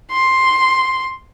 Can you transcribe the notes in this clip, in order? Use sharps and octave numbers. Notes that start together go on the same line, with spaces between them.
C6